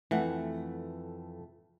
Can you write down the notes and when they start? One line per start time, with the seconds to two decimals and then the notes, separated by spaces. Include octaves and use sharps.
0.11 F2 E3 A3 F#5